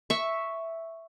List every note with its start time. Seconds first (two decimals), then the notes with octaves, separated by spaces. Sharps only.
0.10 E5 C#6